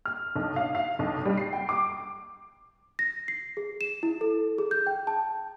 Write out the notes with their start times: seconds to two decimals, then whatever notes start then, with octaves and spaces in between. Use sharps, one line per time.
0.06 F6
0.35 B1
0.56 F5
0.75 F5
0.99 B1
1.26 G3
1.37 C7
1.53 G5
1.69 D6
2.99 A#6
3.28 C7
3.57 G#4
3.81 E7
4.03 E4
4.21 A4
4.58 G#4
4.71 G6
4.87 G5
5.07 A5